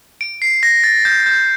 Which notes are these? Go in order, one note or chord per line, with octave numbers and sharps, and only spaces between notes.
D7
C7
A#6
A6
G6
G6